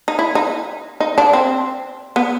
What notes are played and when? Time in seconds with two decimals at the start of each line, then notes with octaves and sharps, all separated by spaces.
0.08 D#4
0.19 E4
0.35 D#4
1.00 D#4
1.18 D4
1.33 C4
2.16 B3